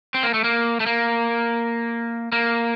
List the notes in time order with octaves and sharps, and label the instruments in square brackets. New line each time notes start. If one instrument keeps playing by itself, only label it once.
[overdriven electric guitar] C4
A#3
A3
A#3
A3
A#3
A#3